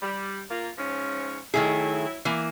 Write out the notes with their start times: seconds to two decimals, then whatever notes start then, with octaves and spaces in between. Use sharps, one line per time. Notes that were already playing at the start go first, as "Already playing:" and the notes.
0.02 G3
0.51 A#3 F4
0.78 G#2 F3 C#4
1.54 D#3 F#3 A3 E4 G#4
2.25 E3 A#3